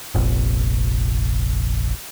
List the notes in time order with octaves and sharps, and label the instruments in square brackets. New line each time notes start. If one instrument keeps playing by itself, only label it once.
[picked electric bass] F1 A#1